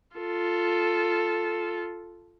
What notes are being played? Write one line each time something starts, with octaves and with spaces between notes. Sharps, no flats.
F4 A4